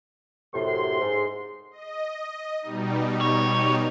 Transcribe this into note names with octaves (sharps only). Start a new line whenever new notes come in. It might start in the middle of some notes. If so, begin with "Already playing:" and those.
F#2 A2 C3 C6
G#2
D#5
B2 G3 D#4
C#2 C#5